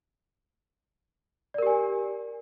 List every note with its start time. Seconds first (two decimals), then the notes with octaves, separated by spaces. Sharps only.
1.54 D5
1.58 A#4
1.62 G4
1.67 G#5